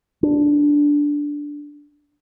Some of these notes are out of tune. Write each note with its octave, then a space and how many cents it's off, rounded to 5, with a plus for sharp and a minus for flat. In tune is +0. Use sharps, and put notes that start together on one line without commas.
D4 -5